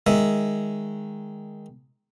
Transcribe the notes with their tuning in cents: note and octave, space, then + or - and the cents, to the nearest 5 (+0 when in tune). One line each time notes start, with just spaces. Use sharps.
D#3 +0 G#3 +0 E5 +0